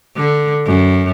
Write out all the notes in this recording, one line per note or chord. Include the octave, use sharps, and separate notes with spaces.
D3
F#2